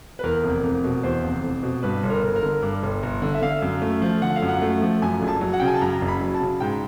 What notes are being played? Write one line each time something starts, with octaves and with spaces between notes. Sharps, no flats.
B4
E2 A#4
F1
F1
B2
E2 C5
F1
F1
B2
G2 B4
G1
A#4
G1
A#4
D3
G2
G1
G1
D3
E5
D3 F5
F#2
A3
F3
D3 F#5
F5
F#2
F#5
A3
F3
F#2 G#5
F#1
A5
F#3
F#5
C#3 G5
G#5
A5
F#2 A#5
F#1
B5
F#3
A5
C#3
G#2 G5